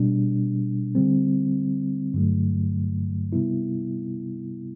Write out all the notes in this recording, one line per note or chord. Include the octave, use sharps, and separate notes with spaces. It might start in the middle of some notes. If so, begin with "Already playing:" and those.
Already playing: B2 G3 D4
D3 G3 C4
G2 D3 F#3 A3
C3 G3 B3 E4